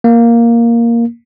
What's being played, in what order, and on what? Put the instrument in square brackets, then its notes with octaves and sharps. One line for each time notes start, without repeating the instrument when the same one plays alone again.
[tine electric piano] A#3